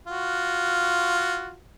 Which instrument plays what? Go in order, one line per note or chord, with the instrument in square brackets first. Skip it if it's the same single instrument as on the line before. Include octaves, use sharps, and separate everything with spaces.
[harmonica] F4 F#4